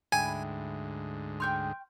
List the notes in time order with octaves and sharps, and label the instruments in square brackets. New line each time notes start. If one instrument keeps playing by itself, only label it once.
[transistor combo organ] D2 G#2 [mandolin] E4 [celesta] G5 [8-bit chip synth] G#5
[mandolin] G5 C#6 F6 [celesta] C6 G6